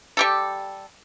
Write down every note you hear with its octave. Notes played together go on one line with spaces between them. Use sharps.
G3 G4 A4